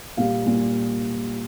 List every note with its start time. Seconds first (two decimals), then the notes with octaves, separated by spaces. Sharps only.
0.17 A#2 G3 F5
0.46 A#2 G3